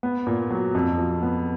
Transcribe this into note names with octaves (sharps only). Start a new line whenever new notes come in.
B3
A#2
F#3
F2
F3
B3